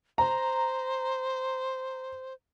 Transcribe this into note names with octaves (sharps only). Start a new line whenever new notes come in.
C5 A#5